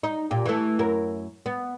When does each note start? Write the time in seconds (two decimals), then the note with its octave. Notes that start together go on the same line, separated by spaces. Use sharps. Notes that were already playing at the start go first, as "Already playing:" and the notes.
0.03 D#4
0.31 A#2 G4
0.46 E3 A3
0.79 F#2 E4 A#4
1.46 B3